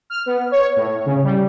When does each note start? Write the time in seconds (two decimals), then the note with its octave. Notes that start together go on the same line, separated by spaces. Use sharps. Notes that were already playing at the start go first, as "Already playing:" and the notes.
0.10 F6
0.26 B3
0.51 C#5
0.76 A2
1.06 C#3
1.24 G3